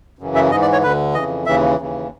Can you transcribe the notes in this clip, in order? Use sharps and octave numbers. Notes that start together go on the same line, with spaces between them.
F#2 C#3 E3
E5
G#2 E3 D#5
D5
C#5
D2 D3 B4
F2 C#3 E3 D#5
D#2 C#3 E3 E5
D#2 C#3 E3